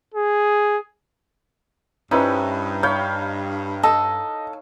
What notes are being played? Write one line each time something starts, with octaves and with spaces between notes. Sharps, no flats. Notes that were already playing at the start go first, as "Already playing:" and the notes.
G#4
G2 C#4 D#4 E4 B4 C5
C#5 F5 B5 G6
A4 D#5